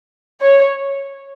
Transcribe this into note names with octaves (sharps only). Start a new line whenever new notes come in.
C#5